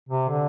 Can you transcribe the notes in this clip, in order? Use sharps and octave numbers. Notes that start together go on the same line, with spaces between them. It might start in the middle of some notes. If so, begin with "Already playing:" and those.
C3
D3